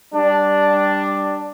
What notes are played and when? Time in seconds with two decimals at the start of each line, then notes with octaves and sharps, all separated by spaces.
0.14 G3 D4